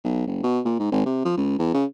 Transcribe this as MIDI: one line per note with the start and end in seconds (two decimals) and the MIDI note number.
0.04 0.25 35
0.27 0.41 30
0.43 0.60 47
0.65 0.76 46
0.79 0.91 44
0.91 1.03 32
1.05 1.21 48
1.25 1.35 53
1.37 1.56 37
1.59 1.72 40
1.74 1.85 49